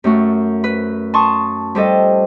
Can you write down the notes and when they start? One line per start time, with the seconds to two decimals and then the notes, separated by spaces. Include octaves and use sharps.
0.04 F#2 A3 F#4
0.64 B4
1.14 A5 C6 C#6 D#6
1.75 F3 G3 A4 D#5